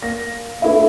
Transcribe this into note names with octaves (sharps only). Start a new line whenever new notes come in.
A#3 A#6
A3 D4 E4 F4 B4 E5